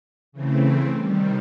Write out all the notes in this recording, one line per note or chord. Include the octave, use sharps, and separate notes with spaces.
C#3 E3 A3 C4
C3 D#3 G3